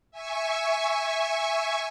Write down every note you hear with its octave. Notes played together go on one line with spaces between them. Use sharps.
E5 G#5 C#6